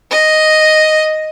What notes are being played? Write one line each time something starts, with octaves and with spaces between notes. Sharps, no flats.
D#5